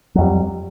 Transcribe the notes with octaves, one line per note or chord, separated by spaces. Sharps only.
F2 F#3 G3